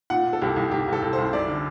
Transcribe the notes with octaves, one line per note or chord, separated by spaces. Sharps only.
A#2 F#5
A#2
A4
C2 G4
C2
C2 G4
C2 A4
C2
C5
C2
F#2 D5
D3